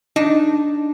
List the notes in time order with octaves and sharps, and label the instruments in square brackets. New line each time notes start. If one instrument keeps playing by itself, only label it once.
[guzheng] D4 [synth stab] D#4